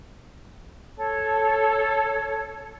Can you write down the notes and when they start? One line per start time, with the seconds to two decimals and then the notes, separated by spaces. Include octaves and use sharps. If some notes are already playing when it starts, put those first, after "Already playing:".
0.97 A4 C#5